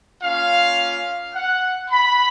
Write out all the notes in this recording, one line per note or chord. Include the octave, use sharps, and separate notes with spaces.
A#3 C#4 F4 F5
F#5
B5